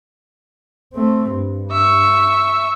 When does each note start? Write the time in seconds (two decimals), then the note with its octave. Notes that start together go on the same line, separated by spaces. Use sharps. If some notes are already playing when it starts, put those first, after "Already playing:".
0.94 A3 C4
1.31 G2
1.72 E5 C#6